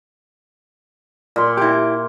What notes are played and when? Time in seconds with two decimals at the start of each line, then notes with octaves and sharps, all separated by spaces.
1.36 A#2 C6
1.57 E4 G4